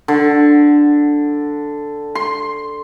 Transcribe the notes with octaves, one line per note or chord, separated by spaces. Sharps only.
D3
C6